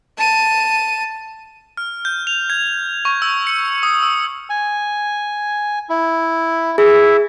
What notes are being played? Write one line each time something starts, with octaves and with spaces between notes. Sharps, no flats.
A5 D#7
F6
G6
F7
G#6
C#6
E6
C#7
D#6
E6
G#5
E4
E4 G#4 E5